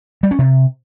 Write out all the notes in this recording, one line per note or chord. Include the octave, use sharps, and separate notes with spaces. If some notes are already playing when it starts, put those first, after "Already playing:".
G3
C#4
C3